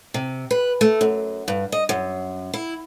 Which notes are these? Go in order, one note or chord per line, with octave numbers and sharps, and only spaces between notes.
C3
B4
A3
F#2
G2
D#5
F#2
E4